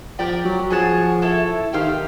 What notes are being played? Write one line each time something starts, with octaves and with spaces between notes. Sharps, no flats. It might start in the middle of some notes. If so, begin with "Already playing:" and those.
F3 G4 A#4 D5 G5
F#3
F3 G#4 C#5 F#5 A5
E4 A4 C#5
D#3 G4 C5 F5